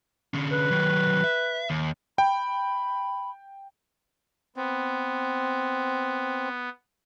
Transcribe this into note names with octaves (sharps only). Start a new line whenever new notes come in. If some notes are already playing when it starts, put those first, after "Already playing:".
D3 C#4
B4
D#3 F#3
E5
D#2
G5 B5
B3 C4